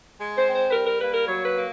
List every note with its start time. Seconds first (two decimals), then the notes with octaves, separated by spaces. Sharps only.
0.19 G#3
0.38 C5
0.46 C4
0.55 C5
0.68 B4
0.73 G3 A#4
0.87 A#4
1.00 A#3 B4
1.14 A#4
1.28 F#3 C#5
1.45 B4
1.55 A#3